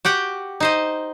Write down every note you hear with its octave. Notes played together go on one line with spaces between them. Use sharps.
F#4 G4 F#5 G5
D#4 C5 D#5